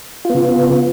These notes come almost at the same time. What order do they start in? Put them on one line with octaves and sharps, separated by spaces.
F4 B3 C#3